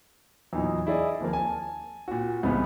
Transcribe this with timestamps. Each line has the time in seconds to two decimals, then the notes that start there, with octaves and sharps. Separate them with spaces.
0.53 E2 A#2 F#3 D#4 E4
0.87 E4 G#4 D5 D#5
1.20 D#2 F3 A#3
1.33 G#5 A5
2.08 A#2 F#4
2.43 C2 G#2 C#3 E3 B3